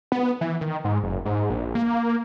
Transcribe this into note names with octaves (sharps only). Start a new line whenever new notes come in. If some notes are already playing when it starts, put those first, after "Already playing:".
B3
E3
D#3
G#2
F#1
G#2
A#1
A#3